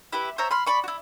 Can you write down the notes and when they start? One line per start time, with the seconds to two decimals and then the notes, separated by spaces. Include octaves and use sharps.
0.13 E4 G4 B4
0.38 C5 C#5 E5 A#5
0.51 B5 C6 F6
0.67 D5 B5 C#6
0.84 E4 F#4